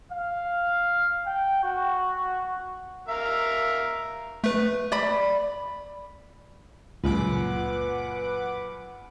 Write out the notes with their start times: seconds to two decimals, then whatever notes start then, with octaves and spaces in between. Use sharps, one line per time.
0.10 F5
1.23 G5
1.62 F#4
3.08 A#4 E5 F5
4.44 A3 B4
4.92 D5 B5
7.04 C#2 F#2 A#2 F4 B4 F#5 D6